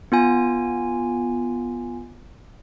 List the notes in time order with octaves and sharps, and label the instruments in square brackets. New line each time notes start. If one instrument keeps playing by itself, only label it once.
[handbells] B3 F4 G#5